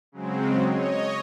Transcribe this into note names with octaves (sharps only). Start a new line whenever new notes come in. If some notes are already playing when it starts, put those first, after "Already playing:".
C#3 F#3 G#3 C4
C#5 D#5